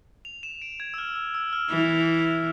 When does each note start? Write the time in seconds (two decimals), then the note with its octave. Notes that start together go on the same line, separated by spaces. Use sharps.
0.25 F7
0.43 E7
0.62 D7
0.80 G#6
0.94 E6
0.98 F6
1.16 E6
1.35 E6
1.53 F6
1.70 E3